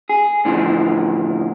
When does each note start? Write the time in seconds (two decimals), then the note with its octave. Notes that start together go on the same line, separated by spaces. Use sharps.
0.09 G#4
0.45 A2 D3 E3 F3